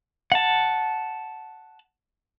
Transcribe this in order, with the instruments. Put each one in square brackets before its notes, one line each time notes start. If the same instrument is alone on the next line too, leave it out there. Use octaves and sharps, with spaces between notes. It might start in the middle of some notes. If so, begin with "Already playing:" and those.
[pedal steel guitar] F#5 A5